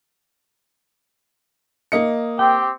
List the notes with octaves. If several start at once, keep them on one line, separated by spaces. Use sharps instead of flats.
A#3 D#5 C#7
C4 G4 G5